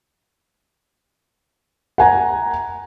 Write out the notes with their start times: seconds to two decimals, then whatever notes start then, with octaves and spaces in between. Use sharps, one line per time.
1.98 F#5 G#5 A#5